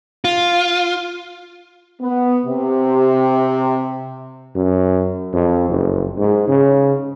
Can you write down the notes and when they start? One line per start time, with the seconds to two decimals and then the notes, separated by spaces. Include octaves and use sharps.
0.25 F4
2.02 B3
2.46 C3
4.55 F#2
5.33 F2
5.69 F#1
6.17 G#2
6.48 C#3